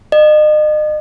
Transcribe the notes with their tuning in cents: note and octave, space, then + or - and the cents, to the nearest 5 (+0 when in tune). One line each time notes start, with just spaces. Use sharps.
D#5 -40